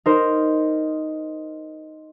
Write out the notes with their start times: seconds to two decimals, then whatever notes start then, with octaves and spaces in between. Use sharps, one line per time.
0.06 D#4 A#4 C5